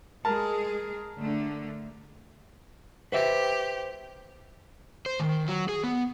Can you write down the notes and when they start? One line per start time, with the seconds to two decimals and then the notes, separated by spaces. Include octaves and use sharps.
0.25 G#3 G#4 A#4 A5
1.20 D3 A3
3.12 G4 B4 C5 E5
5.06 C5
5.19 D#3
5.48 F#3
5.69 G#4
5.84 B3